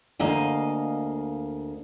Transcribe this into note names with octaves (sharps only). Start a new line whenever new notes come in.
D2 A#3 D#5 F5 G#5